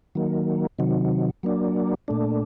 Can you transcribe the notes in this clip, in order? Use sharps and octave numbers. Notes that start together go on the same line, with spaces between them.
D#3 F#3 A#3
C3 D#3 F#3
F#3 A#3 D4
A#2 A3 D4